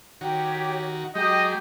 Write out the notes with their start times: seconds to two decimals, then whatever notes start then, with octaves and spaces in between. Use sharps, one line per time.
0.21 D#3 F#4 G4 C#5
1.15 F#3 G#3 G4 D#5 G6